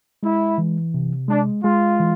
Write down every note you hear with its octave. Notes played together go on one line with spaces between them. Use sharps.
G#3 E4
E3
C3
G#3 D4
G#3 F4
E3